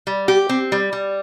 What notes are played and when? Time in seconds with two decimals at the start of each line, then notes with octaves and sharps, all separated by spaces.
0.07 G3
0.28 G4
0.49 C4
0.72 G3
0.93 G3